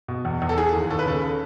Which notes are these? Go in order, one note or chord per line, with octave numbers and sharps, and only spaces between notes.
B2
E2
E2
A4
E3 G#4
D#2
D#2 A4
B4
C#3 A4